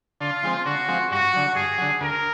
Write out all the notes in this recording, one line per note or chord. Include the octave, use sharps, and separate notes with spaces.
D3 F4
F3 G#3 C4
D3 F#4
F3 G#3 C4
G2 F#4
D3 F#3
G2 G#4
D3 F#3
D2 A#4